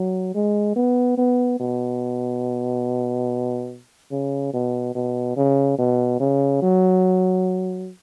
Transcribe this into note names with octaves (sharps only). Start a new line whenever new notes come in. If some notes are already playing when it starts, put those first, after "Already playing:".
Already playing: F#3
G#3
B3
B3
B2
C#3
B2
B2
C#3
B2
C#3
F#3